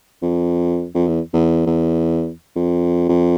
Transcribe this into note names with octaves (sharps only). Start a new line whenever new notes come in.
F2
F2
E2
E2
E2
F2
F2